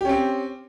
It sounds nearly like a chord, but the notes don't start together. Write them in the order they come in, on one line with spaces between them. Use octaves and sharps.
G4 C#4 C4